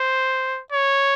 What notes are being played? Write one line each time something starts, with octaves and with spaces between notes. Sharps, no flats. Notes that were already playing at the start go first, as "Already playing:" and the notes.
Already playing: C5
C#5